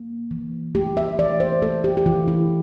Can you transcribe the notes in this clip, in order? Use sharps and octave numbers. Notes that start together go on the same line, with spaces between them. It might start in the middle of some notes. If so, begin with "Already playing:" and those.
Already playing: A#3
E3
A3 G4
E5
E3 D5
C5
A3 A4
G4
G4
E3 F4
E4